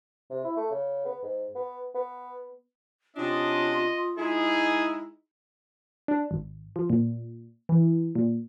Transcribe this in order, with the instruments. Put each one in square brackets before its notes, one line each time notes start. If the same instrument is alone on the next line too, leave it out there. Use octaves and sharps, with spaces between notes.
[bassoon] C3
E4
A3
C#3
B3
G#2
B3
B3
[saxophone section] C3 D4 [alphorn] C#4 [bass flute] F4 [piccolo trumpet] D#5
[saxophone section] G#3 E4 [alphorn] D#4 [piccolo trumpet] G#4
[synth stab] D4
G#1
F3
A#2
E3
A#2